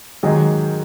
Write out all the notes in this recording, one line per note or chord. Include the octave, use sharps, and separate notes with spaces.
G#2 D#3 F#3 G#4